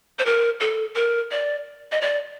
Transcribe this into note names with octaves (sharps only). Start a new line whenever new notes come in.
C5
A#4
A4
A#4
D5
D#5
D5